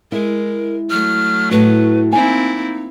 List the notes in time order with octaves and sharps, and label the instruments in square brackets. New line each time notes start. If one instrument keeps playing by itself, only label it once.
[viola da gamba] G#3 [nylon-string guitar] E4 [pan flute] A#4
[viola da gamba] F#3 A3 [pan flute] F6
[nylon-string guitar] A2 F#4 [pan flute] B4
[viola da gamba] A#3 C4 E4 [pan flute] D#4 [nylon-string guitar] G#5